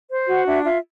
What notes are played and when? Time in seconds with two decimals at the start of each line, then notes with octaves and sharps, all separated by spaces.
0.10 C5
0.27 F#4 F#5
0.46 D4 E5
0.64 F4 E5